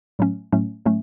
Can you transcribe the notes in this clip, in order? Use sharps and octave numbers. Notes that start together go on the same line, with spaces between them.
A2 F#3 A3 C#4
A2 F#3 A3 C#4
A2 F#3 A3 C#4